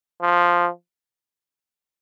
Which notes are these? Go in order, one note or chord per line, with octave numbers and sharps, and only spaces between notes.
F3